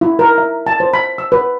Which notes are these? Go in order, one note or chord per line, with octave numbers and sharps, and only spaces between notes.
E4
A#4
E5
A5
C5
B5
E6
B4